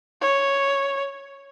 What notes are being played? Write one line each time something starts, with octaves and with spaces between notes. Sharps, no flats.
C#5